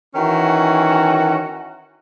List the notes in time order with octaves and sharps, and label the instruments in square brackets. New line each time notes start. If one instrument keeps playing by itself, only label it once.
[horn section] D#3 E3 C#4 F#4